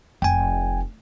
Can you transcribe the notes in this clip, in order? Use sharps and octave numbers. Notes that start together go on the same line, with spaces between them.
F1 G5 G#5